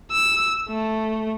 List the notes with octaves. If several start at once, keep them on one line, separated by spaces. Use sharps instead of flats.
E6
A3